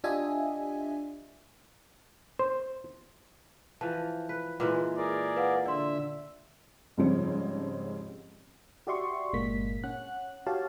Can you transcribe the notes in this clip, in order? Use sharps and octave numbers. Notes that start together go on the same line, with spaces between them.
D4 F4 G4 D#5 E5 G#5
C5
E3 F3 A5
B4
A#2 E3 G#3 B4
G#4 A#4 D5
B4 F5 F#5
D3 D5 E5 C6
G#2 C#3 F3 G3 C4 C#4
F#4 G4 D5 E5 C6 C#6
G1 A#2 G#3 A#3 B6
C#4 F#5 F#6
F#4 G4 C#5 F5 A5